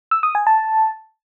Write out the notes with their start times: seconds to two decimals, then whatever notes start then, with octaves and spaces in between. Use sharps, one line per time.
0.11 E6
0.23 D#6
0.35 G#5
0.47 A5